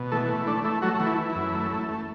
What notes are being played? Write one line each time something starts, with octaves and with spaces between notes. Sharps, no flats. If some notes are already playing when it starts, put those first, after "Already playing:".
Already playing: B2
E3 A3 A4
A3
A3 D4
A3 E4
F#3 A3 F#4
E3 F#4
E4
E3
E4
F#2
A3
A3
A3